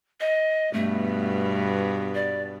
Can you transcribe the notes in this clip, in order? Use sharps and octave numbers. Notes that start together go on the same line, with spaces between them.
D#5
G2 B2 A3 B3
D5